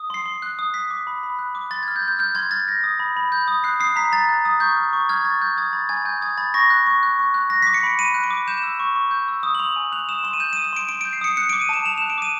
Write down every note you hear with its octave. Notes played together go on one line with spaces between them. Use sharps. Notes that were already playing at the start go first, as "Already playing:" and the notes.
Already playing: D#6
C6 C7
C6
F#6
D#6
F#6 B6
D6
B5
B5
F#6
D6
C6 A6
G#6
F6
G6
C6
G6
F6 G6
C6 G#6
F6 A6
G6 A#6
D#6
B5
B5
G6
D#6
F#6 C7
D#6 C7
A#5 B6
A#5 A6
F#6
D#6
C#6 G6
F6
C#6
F6 G#6
C#6 A6
F6 G6
D#6 G#6
B5 A6
G#5 G#6
G#5 G6
D#6 G#6
B5 A6
C#6 A#6
F#6
C#6
F#6
C#6
F#6
F#6 A#6
B6
D6
C#7
B5 D7
B5 D#7
F#6
D7
D6
G6 E7
E6
C#6
C#6
G6
E6
D#6
F#7
C6 F7
G#5
F#6 F7
D#6 E7
C6 E7
D#7
G6 E7
D#7
D#6
E7
C6 D7
C6 D7
D7
G6
C7
D#6 C#7
F#6 C#7
D7
D6
D#7
A5 E7
A5 F7
E7
F#6
D7
D6 D#7